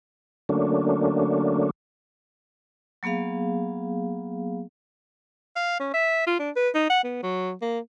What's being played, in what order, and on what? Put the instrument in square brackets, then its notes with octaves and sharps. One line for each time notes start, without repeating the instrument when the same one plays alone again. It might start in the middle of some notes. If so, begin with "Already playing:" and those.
[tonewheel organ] D3 F#3 A3 A#3 C#4 D4
[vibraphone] F#3 A#3 B3 G#4 F5
[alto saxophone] F5
C#4
E5
F4
D4
B4
D#4
F#5
B3
F#3
A#3